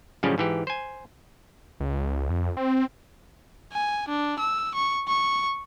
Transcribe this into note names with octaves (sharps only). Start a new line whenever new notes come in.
F#2 A2 C#3 F3 G3 C#4
G#2 E3 G4
C5 G#5
C#2
F2
C4
G#5
D4
E6
C#6
C#6